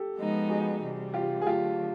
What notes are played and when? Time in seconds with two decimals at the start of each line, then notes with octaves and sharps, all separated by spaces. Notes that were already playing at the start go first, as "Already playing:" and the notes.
Already playing: G4 A4
0.17 F3 G#3 B3 D#4
0.49 F#4 G#4
0.82 C3 E3 G3
1.14 F4 G4
1.42 G#4
1.46 D3 F#3 A3 F4 G4